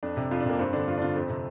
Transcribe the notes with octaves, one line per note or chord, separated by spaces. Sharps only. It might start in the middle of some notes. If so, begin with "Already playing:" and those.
F2 D4
C3
F2 F4
D4
C3 A#3
G2 C4
D3 D4
G2 F4
D4
D3 F4
F2 C4
C3